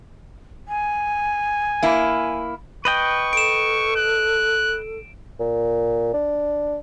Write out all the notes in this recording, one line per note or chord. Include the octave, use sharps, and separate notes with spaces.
G#5
A#3 E4
B4 D#5 G5 C#6
A4 D7 E7
F#6
A#2
D4